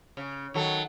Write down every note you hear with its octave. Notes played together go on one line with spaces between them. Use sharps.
C#3
D#3 F#3 A4